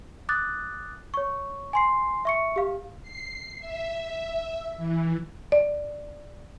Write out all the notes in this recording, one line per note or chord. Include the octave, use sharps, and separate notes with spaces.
D6 D#6 F#6 A6
C#5 C#6
G#5 C6 C7
E5 C#6 C#7
G4 F5
C7
E5
E3
D5